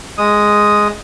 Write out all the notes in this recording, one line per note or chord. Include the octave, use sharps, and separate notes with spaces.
G#3 D#6